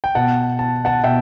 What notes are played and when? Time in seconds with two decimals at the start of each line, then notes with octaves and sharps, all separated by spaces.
0.04 G5
0.15 B2 F#5 A5
0.59 A5
0.85 F#5 A5
1.04 B2 E5 G5